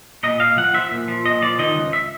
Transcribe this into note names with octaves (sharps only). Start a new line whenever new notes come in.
A#2 D#5
A#2 F5
F3 F#5
F3 E5
A#2
F3
A#2 D#5
F3 D5
D#3 D#5
C#2
E5